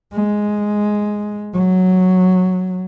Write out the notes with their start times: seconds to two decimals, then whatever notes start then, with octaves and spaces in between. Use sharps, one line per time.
0.12 G#3
1.54 F#3